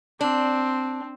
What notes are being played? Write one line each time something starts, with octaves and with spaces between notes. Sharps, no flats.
C4 D4